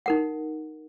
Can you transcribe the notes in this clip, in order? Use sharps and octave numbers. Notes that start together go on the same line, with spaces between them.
D#4 A#4 F#5